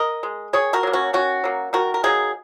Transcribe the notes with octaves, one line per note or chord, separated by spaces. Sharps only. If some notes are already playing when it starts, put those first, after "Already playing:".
Already playing: A#4 D#5
G#3
D#3 G#4 C#5
F#4 A#4
F#3 A#3
C#4 F#4
D#3 C#4 F#4
F#3 A#3
D#3 F#4 A#4
A#4
F#3 A#3 D#4 G#4